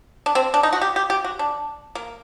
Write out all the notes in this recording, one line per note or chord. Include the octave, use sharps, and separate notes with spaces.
D4
C4
D4
D#4
F#4
G4
G4
G4
F#4
D4
A#3